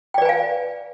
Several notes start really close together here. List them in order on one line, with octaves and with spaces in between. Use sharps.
G5 D5 B4 G#5 F5